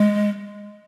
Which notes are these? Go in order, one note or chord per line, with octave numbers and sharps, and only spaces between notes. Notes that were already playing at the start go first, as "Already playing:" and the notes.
Already playing: G#3